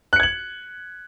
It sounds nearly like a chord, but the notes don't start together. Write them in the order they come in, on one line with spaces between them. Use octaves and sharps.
F#6 C#7 G#6 F#7